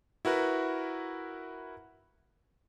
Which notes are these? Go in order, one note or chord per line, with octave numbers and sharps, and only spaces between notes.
E4 F#4 A#4 B4